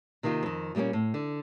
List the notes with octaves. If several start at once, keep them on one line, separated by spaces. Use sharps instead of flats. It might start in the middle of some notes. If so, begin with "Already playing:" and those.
C3 D#3 A#3 D#4 F4
F2 D#3
A#2 G3 G#3 A#3 C#4
A2
D3